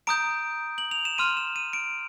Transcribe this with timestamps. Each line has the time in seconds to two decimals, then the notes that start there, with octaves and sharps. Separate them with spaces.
0.07 A#5 D#6 G6 D7
0.78 F#7
0.91 F7
1.05 E7
1.18 C6 F6 D#7
1.37 E7
1.56 D#7
1.73 D7